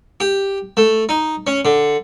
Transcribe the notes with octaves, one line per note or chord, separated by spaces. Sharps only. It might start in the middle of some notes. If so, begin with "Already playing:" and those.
G4
A3
D#4
C#4
D3